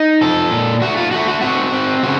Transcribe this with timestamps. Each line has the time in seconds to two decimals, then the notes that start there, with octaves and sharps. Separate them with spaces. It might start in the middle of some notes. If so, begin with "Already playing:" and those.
Already playing: D#4
0.21 F3 A4
0.51 A#2
0.82 A3 F#4
0.97 F4
1.11 A3 F#4
1.28 F#4
1.41 C4 F#4
1.72 C4
2.03 C#3 F#4